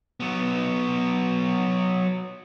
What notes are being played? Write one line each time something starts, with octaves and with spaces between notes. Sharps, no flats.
F#3 B3